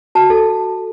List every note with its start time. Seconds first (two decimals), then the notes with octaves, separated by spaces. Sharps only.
0.15 F#4 A5
0.30 A4